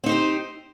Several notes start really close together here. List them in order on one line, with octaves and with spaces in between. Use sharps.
C4 D#4 C5 G4